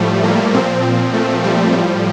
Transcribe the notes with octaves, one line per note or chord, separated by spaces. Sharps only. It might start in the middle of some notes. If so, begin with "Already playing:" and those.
Already playing: A2 F3 G3 A3
A#3
A#2 F3 C4
C4
A3
G3
A2 F3